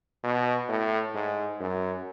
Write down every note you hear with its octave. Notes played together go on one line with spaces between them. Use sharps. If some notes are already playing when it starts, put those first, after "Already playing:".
B2
A2
G#2
F#2